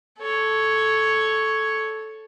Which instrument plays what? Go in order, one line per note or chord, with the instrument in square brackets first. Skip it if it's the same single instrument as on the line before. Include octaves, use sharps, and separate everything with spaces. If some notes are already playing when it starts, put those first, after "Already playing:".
[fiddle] A4 C#5